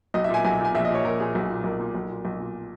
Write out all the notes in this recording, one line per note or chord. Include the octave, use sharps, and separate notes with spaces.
B1 D#5
E5
A#2 G#5
B1 G#5
A#2
G#5
A#1 E5
D#5
A#2 C#5
A#1 A#4
A#2 G#4
B1
A#2
B1 A#4
A#2
B1
A#2
B1
A#2